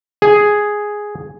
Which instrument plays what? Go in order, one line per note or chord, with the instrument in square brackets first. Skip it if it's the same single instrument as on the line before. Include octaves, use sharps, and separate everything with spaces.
[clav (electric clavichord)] G#4